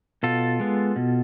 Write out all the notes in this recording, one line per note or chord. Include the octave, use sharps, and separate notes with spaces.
B2 F4 A4
G#3 B3
B2